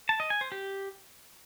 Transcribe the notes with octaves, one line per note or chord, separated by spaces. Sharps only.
A5
D#5
G#5
C5
G4